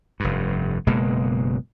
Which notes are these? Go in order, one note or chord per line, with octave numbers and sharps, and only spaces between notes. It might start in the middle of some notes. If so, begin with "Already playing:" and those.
F1 G2
F#1 B2 G#3 A#3